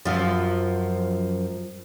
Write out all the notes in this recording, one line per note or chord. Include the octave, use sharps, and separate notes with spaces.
F#2 F3